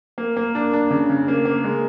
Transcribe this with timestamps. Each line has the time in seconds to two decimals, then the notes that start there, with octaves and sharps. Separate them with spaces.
0.18 A#3
0.36 A#3
0.55 D4
0.73 D4
0.90 C#3
1.09 C#3
1.28 A#3
1.45 A#3
1.64 G#3